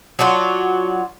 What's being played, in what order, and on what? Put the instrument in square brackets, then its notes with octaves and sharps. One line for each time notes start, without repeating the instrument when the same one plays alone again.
[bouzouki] F#3 D4 F4 F#4